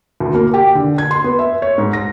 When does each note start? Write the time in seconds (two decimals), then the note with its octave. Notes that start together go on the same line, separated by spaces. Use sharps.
0.20 D2
0.35 A#3
0.54 G4
0.75 D3
0.98 G#6
1.11 C6
1.24 B3
1.39 E5
1.62 C#5
1.78 G#2
1.93 A#6